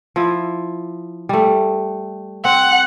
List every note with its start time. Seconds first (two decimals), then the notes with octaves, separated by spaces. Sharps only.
0.16 F3 E4
1.29 G3 A3
2.45 C4 F#5